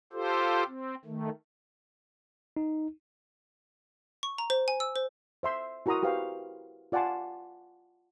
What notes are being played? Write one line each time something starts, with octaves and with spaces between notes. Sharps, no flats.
F4 G4 A4 C5
C4
D#3 A3
D#4
C#6
A#5
C5
G#5
E6
C5
C5 E5 C6
E4 F#4 A#4 A#5 C6 D#6
F#4 G4 B4 C5 F5
F4 D5 F#5 G#5 A5 C6